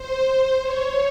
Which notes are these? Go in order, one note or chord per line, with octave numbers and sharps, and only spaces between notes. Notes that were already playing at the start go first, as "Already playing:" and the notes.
Already playing: C5
C#5